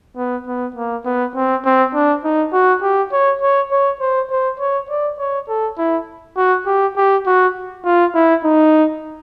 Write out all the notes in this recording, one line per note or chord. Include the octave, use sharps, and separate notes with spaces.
B3
B3
A#3
B3
C4
C4
D4
D#4
F#4
G4
C#5
C#5
C#5
C5
C5
C#5
D5
C#5
A4
E4
F#4
G4
G4
F#4
F4
E4
D#4